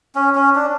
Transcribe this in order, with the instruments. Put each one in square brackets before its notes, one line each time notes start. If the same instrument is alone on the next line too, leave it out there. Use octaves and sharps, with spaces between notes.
[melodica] C#4
C#4
D4